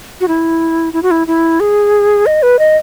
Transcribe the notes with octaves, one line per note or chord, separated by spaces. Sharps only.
F#4
E4
E4
F#4
E4
E4
G#4
D#5
B4
D#5